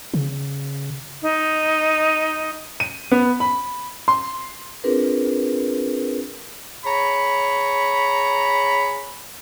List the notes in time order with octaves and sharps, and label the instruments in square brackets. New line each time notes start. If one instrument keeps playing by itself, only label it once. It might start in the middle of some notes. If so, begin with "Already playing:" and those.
[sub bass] C#3
[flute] D#4
[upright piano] D#7
B3
B5
C6
[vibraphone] C4 D4 F4 G#4 A#4 B4
[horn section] G#4 C#5 A#5 B5